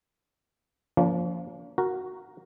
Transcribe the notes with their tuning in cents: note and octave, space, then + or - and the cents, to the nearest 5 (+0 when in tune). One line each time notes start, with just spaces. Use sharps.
F3 +5 A#3 +0 D4 -45
F#4 +0 A#4 +0